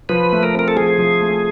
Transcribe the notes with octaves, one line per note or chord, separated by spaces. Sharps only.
F3 B4
A3
A#4
C4 A#4
A4
F3 G#4
F3
A3